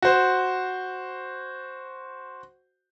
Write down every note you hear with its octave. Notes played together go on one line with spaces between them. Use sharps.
F#4 C5